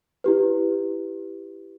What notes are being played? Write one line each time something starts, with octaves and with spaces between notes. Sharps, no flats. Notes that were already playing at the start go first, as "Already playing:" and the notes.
E4 G4 B4